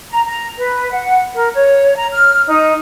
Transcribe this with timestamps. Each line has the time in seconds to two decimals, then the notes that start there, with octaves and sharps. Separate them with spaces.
0.10 A#5
0.26 A#5
0.58 B4
0.92 F#5
1.34 A#4
1.55 C#5
1.96 A#5
2.11 F6
2.47 D#4